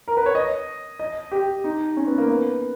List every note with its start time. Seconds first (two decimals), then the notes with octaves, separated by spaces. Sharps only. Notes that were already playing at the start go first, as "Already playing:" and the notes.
0.08 A#4
0.17 B4
0.26 C#5
0.35 D#5
0.99 D#5
1.32 G4
1.64 D#4
1.97 C#4
2.07 B3
2.18 A#3
2.29 B3